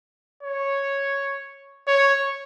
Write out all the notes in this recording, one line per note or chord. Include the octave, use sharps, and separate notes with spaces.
C#5
C#5